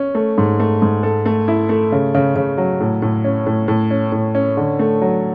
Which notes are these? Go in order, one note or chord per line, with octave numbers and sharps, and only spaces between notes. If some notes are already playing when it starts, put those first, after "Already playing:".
Already playing: C#4
A3
G#2
A3
G#2
A4
A3
E4
A3
C#3
C#3
C#3
F#3
A2
A2
C#4
A2
A2
C#4
A2
C#4
D3
A3
F#3